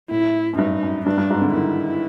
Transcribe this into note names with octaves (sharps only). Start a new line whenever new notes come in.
A2 E4
F#2
G2 D#4
F#2
G2 D4
G2
G#2
D3
D#3 E4